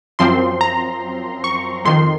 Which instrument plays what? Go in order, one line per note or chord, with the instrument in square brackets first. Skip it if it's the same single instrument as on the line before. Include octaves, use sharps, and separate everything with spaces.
[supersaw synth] F#2 F3 C4 C6
A#5
C#6
F2 D#3 C6